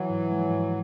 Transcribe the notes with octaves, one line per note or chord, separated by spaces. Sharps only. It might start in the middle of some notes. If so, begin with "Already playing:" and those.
Already playing: E3 F#3
G#2
F3 G#3
G#2